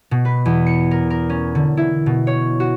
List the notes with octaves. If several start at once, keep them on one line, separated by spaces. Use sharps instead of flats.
B2
B4
E2
C#7
A#4
A#4
C#4
D3
E4
B2
C#5
F#4